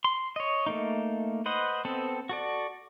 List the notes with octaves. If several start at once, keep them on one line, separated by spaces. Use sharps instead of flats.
C6
C#5 D#5
A3 A#3 D#4
B4 C5 D#5 F#5
B3 C4 A4
F#4 A4 D5